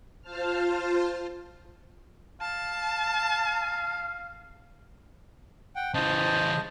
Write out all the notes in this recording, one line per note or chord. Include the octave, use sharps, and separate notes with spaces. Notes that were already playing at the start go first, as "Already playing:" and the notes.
F4 C5 A5 F6
F5 A5
F#5 G5
C#3 E3 C5 D#5 A5